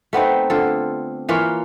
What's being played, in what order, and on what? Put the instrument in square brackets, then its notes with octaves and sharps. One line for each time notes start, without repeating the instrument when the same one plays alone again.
[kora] A3 B3 C4 D#4
D3 F4 A4
E3 A#3 F4 C#5